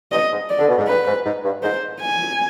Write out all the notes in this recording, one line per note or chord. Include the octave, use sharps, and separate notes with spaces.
G2 D#5
G#2
D5
D3
B2
G#2
G2 B4
G#2
G#2
G2
G#2 C5
G#5